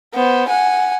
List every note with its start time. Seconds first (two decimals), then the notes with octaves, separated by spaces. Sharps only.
0.15 B3 C5
0.48 F#5 G#5